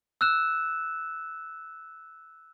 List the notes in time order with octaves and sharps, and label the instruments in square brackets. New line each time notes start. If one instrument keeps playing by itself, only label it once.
[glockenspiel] E6 F#6 E7